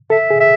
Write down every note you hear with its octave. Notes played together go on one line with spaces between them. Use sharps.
A4 E5
G#4
E5